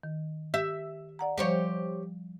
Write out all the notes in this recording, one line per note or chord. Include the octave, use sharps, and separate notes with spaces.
D#3
G4 E5
D5 F#5 A#5
F3 G3 G4 C5 C#5